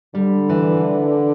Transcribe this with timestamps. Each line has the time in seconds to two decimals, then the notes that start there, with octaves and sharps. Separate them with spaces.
0.15 D3 G3
0.49 E3